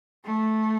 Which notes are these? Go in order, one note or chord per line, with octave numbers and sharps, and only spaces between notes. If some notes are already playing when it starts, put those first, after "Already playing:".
A3